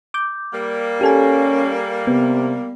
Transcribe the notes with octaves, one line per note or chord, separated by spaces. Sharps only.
D6 G6
G3 A#3
C#4 G4 A4 G#5
C3 B3